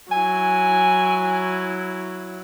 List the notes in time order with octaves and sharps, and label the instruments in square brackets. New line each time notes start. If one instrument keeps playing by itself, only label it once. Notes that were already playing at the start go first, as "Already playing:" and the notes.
[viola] F#3 E4 [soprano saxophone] G#5